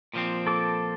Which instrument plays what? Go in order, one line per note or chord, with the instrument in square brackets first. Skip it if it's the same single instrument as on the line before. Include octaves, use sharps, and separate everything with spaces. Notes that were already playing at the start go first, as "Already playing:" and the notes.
[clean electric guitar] A#2 F3 C4
[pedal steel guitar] A4 D6